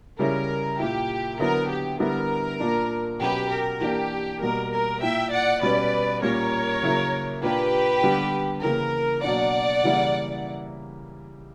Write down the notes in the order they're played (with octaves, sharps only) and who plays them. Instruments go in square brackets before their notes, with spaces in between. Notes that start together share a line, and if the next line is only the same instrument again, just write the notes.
[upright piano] C#3 G3 C#4 E4 [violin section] A#4
[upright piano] A#2 A#3 E4 [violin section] G4
[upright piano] D3 F#3 B3 E4 [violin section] A#4
[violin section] G4
[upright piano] D3 G3 B3 E4 [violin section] A#4
[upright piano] A#2 A#3 D4
[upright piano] B2 F#3 C#4 [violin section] G4 B4
[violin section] A#4
[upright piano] E3 A#3 D4 [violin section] G4
[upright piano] B2 G3 A#3 [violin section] A#4
[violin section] A#4
[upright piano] A#2 A#3 E4 [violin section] E5 G5
[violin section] D5 F#5
[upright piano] B2 G3 C#4 [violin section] B4 D5
[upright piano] A#2 G3 A#3 C#4 [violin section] A#4 C#5
[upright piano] C#3 F#3 A#3 E4
[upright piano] A#2 A#3 D4 [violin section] G4 B4
[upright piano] D3 G3 B3 D4
[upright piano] C#3 E3 A#3 [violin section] A#4
[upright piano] B2 F#3 A#3 D4 [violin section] D5 F#5
[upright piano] C#3 E3 G3 A#3 E4